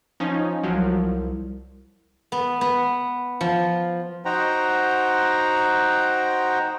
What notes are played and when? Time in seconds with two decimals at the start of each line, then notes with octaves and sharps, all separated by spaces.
0.20 F3 C#4 D#4
0.63 C2 F3 F#3
2.32 B3
2.61 B3
3.41 F3
4.25 D#4 F#4 C5 F#5 G5 A#5